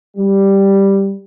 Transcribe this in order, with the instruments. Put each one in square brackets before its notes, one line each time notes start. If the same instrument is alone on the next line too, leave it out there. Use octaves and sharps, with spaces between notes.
[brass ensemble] G3